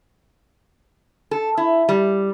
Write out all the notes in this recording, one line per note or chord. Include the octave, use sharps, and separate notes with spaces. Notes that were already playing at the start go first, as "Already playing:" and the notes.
A4
E4
G3